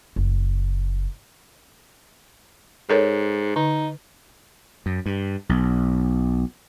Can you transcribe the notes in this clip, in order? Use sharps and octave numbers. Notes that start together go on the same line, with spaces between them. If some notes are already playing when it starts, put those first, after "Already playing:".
F#1
G#2 A4 A#4 C#5
D3 D#4
F#2
G2
B1